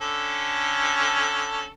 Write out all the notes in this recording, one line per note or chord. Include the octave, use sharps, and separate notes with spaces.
D3 C#4 A4